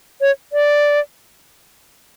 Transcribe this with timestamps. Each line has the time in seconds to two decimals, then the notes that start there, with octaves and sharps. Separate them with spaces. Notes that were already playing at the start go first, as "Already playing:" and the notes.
0.21 C#5
0.53 D5